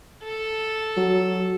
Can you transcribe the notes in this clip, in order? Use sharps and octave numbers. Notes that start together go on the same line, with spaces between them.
A4
F#3